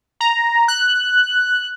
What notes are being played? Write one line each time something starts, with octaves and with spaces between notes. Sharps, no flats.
A#5
F#6